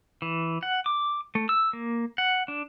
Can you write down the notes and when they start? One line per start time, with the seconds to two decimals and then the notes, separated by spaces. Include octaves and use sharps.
0.22 E3
0.63 F#5
0.86 D6
1.35 A3
1.49 E6
1.73 A#3
2.18 F#5
2.48 D4